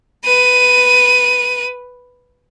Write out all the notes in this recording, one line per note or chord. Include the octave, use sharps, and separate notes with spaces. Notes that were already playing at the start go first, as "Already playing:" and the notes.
B4 D#7